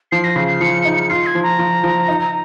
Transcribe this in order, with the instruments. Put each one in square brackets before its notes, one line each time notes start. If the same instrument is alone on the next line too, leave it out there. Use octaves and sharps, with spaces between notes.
[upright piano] F3 [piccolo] C7
[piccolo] A#6
[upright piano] C#3 [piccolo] C7
[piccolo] C7
[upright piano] F3 [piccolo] C#7
[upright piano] D#4
[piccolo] C#7
[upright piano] F4 [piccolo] C7
[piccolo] G#6
[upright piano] F3
[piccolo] A#5
[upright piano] F3
F3
D#4